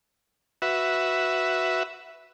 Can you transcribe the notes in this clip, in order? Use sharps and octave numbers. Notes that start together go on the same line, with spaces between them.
F#4 B4 E5